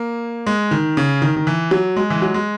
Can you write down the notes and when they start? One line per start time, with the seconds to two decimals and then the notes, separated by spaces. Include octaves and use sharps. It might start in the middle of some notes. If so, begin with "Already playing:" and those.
Already playing: A#3
0.47 G#3
0.71 D#3
0.97 C#3
1.22 D#3
1.37 D#3
1.47 E3
1.71 F#3
1.97 G#3
2.10 E3
2.22 F#3
2.34 G#3